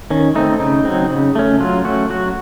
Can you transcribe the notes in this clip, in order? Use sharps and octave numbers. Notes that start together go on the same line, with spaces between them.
D#3 C#4
A3 C4 D#4
C#3 D#4
F#3 C4
C#3
A3 C#4
F#3 F4
A3 C#4 F#4
F#3 F#4